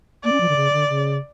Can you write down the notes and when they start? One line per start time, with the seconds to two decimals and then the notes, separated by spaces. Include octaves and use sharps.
0.24 A#3 D5
0.32 C#4
0.41 F3
0.49 D3
0.56 C#3
0.73 D3
0.89 C#3